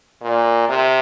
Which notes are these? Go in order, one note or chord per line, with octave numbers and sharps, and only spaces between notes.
A#2
C3